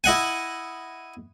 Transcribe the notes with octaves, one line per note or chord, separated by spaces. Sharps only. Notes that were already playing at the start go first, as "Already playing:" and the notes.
E4 D#5 F#5 G#5